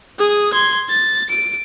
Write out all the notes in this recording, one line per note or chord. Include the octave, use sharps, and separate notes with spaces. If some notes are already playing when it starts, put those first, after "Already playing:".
G#4 D#6
C6 G#6
A6
D7